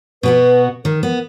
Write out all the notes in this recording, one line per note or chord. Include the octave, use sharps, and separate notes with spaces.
B2 B3 F#4 B4
D#3 A#4
B3 A#4